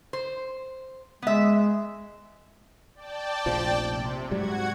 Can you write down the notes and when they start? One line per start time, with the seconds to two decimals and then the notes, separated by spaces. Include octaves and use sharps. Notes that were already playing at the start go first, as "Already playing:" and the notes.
0.13 C5
1.22 G#3 B3 E5
2.95 D5 G5 A5
3.46 F1 A#1 F3
3.83 C3
4.31 G#2 F#3 G3 F#4 F#5 G#6